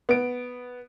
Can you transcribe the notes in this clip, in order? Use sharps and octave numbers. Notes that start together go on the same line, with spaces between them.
B3 D7